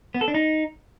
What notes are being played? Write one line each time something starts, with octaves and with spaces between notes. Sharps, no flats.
B3
A4
D4
D#4